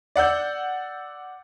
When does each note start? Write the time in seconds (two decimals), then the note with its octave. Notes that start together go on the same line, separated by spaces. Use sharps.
0.16 D5 F#5 E6 G6